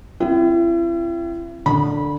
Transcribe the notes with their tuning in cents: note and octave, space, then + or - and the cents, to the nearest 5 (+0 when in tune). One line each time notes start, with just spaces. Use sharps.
C4 +20 E4 +40 G5 -25
D3 +0 B5 -20